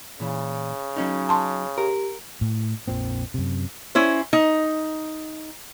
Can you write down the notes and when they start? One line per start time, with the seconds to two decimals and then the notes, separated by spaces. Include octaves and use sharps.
0.20 A#2 C#3 E3
0.96 F#3 C#4 D#4
1.29 A5 C6
1.78 G4 A#4
2.41 A2
2.88 A#1 F2 A#2 C4
3.34 F#2 C3
3.95 C#4 E4 C5
4.33 D#4